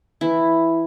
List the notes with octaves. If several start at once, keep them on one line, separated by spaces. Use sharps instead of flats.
E3 E4